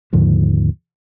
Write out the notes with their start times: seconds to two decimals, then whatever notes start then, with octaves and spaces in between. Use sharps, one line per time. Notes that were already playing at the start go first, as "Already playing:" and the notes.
0.13 D#2 G#2 D3 F3